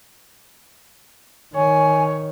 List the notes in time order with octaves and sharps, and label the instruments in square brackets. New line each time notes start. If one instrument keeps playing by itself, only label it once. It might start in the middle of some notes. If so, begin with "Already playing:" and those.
[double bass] D#3 [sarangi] C#5 [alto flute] G#5